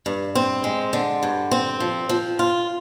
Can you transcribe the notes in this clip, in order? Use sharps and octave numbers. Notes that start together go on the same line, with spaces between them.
G2
C4
G#3
D3
G2
C4
F3
F3
F4